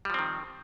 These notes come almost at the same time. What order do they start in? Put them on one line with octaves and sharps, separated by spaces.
G3 F3 C4 D#3